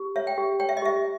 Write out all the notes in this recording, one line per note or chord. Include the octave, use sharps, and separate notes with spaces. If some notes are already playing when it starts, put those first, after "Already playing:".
Already playing: G4
C#5 E5
G5
G4
C#5 G5
E5
D#5
G4 E5